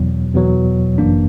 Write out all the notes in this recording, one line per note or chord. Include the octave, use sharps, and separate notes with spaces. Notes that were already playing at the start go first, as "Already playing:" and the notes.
Already playing: E2 B2 F#3
E2 B2 F#3
G1 F#2 E3 A#3 D4